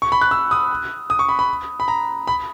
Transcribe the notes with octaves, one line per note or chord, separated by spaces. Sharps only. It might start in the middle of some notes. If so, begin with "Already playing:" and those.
C#6
B5
F#6
E6
D#6
D#6
C#6
B5
B5
B5
A#5
B5